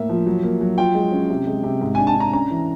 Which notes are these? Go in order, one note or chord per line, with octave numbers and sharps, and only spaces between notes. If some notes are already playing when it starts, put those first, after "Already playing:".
Already playing: A2 A#3 E5
F3
F#3
A#3
F#3
F4 G5
G#3
C#4
C3
G#3
C3
G#2
D4 G#5
A5
D4 A#5
C#4 A#5
E3